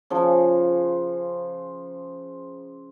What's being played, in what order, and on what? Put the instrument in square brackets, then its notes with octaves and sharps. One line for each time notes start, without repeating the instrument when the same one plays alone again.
[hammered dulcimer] C#3 F3